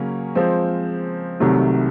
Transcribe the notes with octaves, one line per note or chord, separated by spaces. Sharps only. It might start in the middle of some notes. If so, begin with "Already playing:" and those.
Already playing: C#3 F#3 A#3 C#4
F3 G#3 C4
C2 C3 D#3 F#3 A3